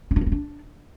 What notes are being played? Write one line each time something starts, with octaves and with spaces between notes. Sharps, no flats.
C#4
D4
C#4
B3
D4